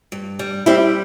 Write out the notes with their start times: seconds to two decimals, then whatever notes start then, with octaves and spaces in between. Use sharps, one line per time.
0.12 G2
0.39 G3
0.66 G3 C4 E4